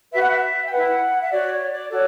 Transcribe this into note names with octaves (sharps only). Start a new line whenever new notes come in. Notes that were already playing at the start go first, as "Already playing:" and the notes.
F#4 B4 E5
F#5
E5
G5
E4 B4 F#5
E5
F#4 C#5 D5
C#5
D5
F#4 A4 C#5 D5